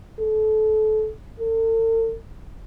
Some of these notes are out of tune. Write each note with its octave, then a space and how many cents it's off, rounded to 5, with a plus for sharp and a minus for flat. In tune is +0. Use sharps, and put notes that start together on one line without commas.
A4 -25
A4 +45